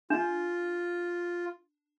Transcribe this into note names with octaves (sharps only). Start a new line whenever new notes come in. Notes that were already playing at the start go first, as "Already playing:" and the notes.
D4 F4